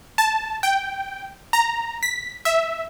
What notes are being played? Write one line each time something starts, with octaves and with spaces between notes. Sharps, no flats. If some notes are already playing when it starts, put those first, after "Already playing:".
A5
G5
A#5
B6
E5